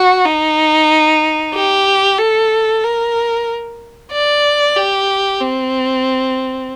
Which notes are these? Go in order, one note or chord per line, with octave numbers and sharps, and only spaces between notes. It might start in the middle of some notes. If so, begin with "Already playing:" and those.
Already playing: F#4
D#4
G4
A4
A#4
D5
G4
C4